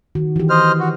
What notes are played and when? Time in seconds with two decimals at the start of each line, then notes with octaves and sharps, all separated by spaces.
0.15 D#3 F#4
0.36 E3 G4
0.50 C5 D#5 F6
0.80 F#4